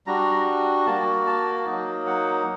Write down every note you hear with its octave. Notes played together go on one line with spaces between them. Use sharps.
G3 D4 F#4 A#5
A#3 F#4 A5
A5
F#3 A#3 D#4
F#5